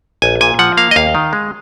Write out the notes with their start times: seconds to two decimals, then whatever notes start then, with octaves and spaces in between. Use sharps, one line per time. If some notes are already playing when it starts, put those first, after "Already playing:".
0.22 A#1 G#5
0.41 A#2 G#5
0.59 F3 F#5
0.77 A#3 F5
0.91 D#5
0.96 D#2 F5
1.15 D#3
1.33 G#3